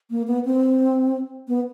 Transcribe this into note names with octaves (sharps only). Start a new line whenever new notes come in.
A#3
B3
C4
B3